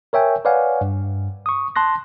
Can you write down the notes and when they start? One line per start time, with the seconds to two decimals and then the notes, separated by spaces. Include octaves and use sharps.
0.13 A#4 C#5 E5 G5 G#5
0.45 B4 C#5 D5 F5 F#5 G#5
0.81 G2
1.46 C#6 D#6
1.76 A5 C6 F#6 A#6